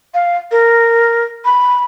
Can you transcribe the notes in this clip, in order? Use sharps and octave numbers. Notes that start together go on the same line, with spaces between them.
F5
A#4
B5